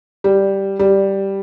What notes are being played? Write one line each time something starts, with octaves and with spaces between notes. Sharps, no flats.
G3
G3